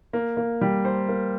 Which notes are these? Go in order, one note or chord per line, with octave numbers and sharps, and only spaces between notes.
A#3
A#3
G3
C5
A#3